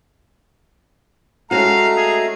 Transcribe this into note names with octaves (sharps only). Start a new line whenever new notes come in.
G#3 A3 C#4 F#4 F5 A#5
G#4